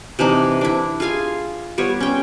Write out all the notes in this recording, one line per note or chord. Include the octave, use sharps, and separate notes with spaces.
C3 E3 D4 D#4
D4 E4
F4 G#4 F5 G#5
G3 B3 F4 C#5
C#4 G5